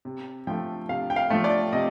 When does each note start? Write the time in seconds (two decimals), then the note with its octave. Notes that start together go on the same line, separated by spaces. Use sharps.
0.05 C3
0.47 F3 A3 G5
0.89 C3 F5
1.10 G5
1.16 F5
1.30 F3 A3
1.44 D5
1.73 C3 D#5